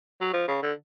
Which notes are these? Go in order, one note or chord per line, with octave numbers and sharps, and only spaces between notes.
F#3
F3
C#3
D3